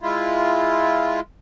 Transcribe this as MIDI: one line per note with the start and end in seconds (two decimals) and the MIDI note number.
0.01 1.20 56
0.01 1.20 64
0.01 1.20 65